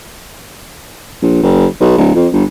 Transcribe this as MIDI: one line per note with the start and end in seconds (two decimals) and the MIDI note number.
1.22 1.43 34
1.43 1.66 30
1.80 1.93 35
1.97 2.14 26
2.15 2.27 41
2.33 2.44 31